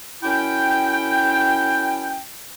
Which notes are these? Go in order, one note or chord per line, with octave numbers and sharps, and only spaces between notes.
F#2 C#4 E4 G5